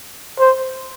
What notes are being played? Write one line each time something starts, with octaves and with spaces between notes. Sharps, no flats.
C5